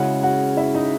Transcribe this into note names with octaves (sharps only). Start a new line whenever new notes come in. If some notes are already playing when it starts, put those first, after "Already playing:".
Already playing: C#3 G#3 C#4 E4 F#4 F#5
F#4 F#5
E4 E5
D#4 D#5